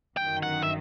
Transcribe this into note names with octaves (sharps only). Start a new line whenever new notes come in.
G1 F#2 D#3 G5
F#5
E5